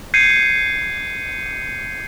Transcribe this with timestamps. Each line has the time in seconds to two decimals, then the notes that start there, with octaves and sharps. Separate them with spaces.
0.14 G6 G#6 C7 C#7 D#7